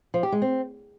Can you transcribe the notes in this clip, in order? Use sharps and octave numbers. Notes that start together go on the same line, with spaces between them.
F3
G4
G#3
C4